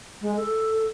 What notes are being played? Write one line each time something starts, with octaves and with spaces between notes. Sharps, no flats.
G#3
A4